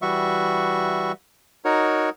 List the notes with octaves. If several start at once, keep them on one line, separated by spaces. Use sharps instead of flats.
E3 G3 F#4 E5 C#6
D#4 F#4 A#4 C#5